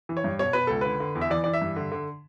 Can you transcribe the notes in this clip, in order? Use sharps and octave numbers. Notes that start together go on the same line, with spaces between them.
E3
C#5
G2
B2 C#5
B2 B4
C#2 A4
D3 B4
D3
E2
E5
E3 D5
E3 D5
E5
G2
D3
D3